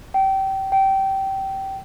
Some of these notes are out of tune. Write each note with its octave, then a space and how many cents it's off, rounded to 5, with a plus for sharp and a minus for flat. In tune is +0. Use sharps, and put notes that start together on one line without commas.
G5 -25
G5 -20